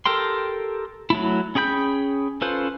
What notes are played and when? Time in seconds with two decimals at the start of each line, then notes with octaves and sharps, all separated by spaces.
0.06 G4 A4 A#4 G5 C6
1.10 F#3 A3 E4
1.55 C#4 G#4 G5 B5 G6
2.41 C#4 F4 A4 B4 C5